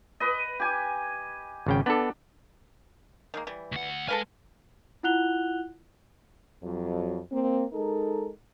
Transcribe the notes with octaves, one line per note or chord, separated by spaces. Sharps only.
B4 D#5
G4 G#5
G#1 C#3 G5
B3 D4 A4
D#3 G#3 A#3
E3 G3
D2 F#5
G#3 A4 B4 F5 G#5
E4 F4 F#5 F#6 F7 G7
F2 F#3
A#3 C4
G#3 D#4 A4 A#4